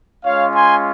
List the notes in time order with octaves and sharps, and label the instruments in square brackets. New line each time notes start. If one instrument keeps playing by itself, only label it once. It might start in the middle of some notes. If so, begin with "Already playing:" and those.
[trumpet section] G#3 C#4 F4 C#5 F5
G#5 C6